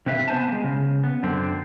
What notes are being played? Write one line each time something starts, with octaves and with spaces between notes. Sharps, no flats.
C3 C4 B4 E5 F5
B3 C5 G#5 A5
G#3 A#3
C#3
B3
F#2 D3 C4